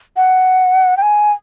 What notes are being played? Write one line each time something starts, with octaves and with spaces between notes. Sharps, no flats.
F#5
G5
G#5